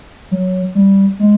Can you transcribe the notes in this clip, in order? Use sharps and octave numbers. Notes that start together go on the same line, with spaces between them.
F#3
G3
G#3